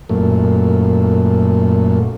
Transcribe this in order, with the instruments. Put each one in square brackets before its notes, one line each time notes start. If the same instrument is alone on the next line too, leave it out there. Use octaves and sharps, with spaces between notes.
[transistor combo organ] F#2 A#2 A3